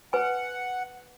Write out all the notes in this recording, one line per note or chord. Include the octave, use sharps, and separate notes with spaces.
B4 F#5 G#5